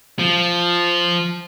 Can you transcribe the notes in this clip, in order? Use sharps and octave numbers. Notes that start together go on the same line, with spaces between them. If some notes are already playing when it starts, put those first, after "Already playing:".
F3